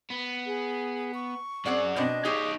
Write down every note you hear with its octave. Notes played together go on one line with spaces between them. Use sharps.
B3
G#4
C#6
F#2 C4 G#4 D5 F#5
B2 C4 D4 D#5
D#4 G4 G#4 C#5